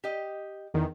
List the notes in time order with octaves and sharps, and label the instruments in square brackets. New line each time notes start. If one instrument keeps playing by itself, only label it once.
[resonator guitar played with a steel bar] G4 D#5
[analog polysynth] E2 D#3